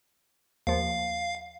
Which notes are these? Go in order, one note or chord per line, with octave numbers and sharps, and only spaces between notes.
D#2 F3 F5